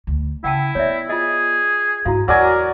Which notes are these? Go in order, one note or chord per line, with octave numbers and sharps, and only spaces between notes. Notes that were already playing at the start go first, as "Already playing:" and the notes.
D2
C#3 E4 F#5 G5 A5
B3 C#5 D5 E5
F4 G#4 D#5
G#2 E4 F#4 F5
E2 F#3 A#4 D5 G#5